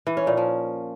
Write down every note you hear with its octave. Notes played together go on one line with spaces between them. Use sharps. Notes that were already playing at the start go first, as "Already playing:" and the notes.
E3
C#4
A#2
F3